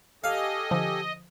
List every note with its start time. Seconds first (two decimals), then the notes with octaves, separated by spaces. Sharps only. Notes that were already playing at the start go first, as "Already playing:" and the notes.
0.24 G4 A4 D#5 F5 G#5
0.71 D3 F3